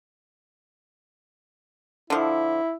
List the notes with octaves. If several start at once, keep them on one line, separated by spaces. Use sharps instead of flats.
D3 F3 E4